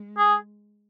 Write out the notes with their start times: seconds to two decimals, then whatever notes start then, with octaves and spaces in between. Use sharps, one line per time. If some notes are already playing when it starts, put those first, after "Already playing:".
Already playing: G#3
0.18 G#4